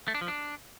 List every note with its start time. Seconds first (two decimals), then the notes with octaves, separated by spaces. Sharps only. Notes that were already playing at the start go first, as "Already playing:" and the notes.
0.08 A3
0.15 D4
0.21 F3
0.28 D4